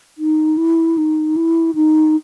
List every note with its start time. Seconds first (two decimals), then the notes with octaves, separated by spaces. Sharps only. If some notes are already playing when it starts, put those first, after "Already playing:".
0.18 D#4
0.57 E4
0.98 D#4
1.36 E4
1.75 D#4